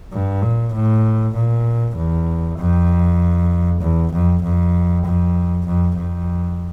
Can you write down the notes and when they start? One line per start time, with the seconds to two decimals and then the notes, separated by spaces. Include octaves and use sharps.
0.12 G2
0.43 A#2
0.73 A2
1.35 A#2
1.96 E2
2.59 F2
3.81 E2
4.12 F2
4.43 F2
5.05 F2
5.67 F2
5.97 F2